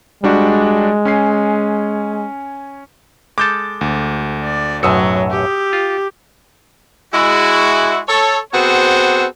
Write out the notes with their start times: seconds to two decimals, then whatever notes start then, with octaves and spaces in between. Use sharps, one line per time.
0.24 G3 G#3 D4 F#4
1.05 C#4 G#5 C7
3.38 G#3 A4 D6 G6 A6
3.81 D2
4.43 D5
4.83 B1 F#2 A2 F#3 D#6 E6 C#7
5.31 G4
5.73 F4
7.14 G#3 E4 F#4
8.08 A4 C#5
8.52 B3 C4 F#4 G#4 A4 C5